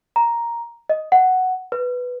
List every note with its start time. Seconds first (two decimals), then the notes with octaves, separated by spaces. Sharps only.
0.16 A#5
0.89 D#5
1.12 F#5
1.72 B4